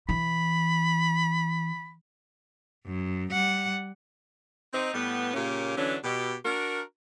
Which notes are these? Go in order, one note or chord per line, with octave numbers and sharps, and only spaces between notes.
E3 B5
F#2
G3 F#5
C4 D#4
A2 G3 B3
A#2 C#3 A#3 C#4 G4
D3 E3 F#3 C#4 D4
B2 G4
D4 F#4 A#4